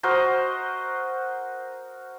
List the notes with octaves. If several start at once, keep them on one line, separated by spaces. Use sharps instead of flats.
F#4 A#4 C5 D#5